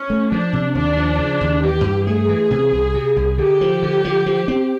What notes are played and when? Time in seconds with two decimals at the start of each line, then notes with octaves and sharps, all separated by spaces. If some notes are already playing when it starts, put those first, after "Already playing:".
Already playing: C#4
0.10 A3
0.32 F3 D4
0.53 C3
0.75 D#2 D4
0.97 F3
1.19 C#3
1.41 D#2
1.63 E3 G4
1.84 G2
2.06 A3 G#4
2.28 E3
2.51 C3
2.72 C2
2.94 C3
3.16 C2
3.38 D3 G4
3.61 F3
3.82 D3
4.05 F3
4.26 F3
4.48 C4